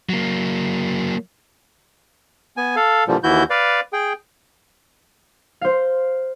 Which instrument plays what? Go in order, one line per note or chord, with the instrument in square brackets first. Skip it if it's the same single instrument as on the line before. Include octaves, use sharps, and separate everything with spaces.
[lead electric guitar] F#3 A#3
[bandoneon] B3 G#5
A4 F5
A#2 D3 E3 F3 G3
D#2 E3 E4 F#4 G6
B4 D5 F5
G#4 G5
[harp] C5 F5